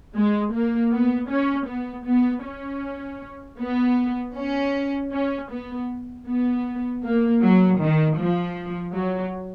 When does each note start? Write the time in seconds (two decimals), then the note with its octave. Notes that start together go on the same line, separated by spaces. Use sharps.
0.16 G#3
0.53 A#3
0.92 B3
1.30 C#4
1.68 B3
2.06 B3
2.45 C#4
3.59 B3
4.35 C#4
5.12 C#4
5.51 B3
6.27 B3
7.04 A#3
7.42 F#3
7.81 D#3
8.19 F3
8.95 F#3